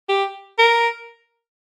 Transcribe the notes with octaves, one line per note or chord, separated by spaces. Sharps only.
G4
A#4